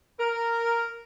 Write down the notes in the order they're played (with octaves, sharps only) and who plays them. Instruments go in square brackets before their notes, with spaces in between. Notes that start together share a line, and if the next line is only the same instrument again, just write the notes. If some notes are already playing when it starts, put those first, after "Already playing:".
[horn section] A#4